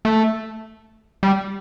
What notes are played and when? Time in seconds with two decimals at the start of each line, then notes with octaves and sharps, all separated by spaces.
0.05 A3
1.23 G3